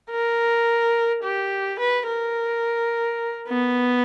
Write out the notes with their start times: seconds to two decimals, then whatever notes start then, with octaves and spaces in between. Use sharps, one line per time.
0.11 A#4
1.23 G4
1.79 B4
2.08 A#4
3.48 B3